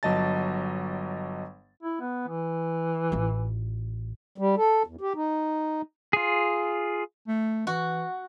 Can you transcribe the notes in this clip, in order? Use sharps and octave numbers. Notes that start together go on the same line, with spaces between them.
G1 F#3 D#5 A5 A6
E4
B3
E3
A1 F4
G3
A4
E2
G4
D#4
F4 G#4
A3
E3 F#4